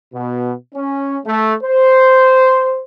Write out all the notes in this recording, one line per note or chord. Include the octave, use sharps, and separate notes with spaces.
B2
C#4
A3
C5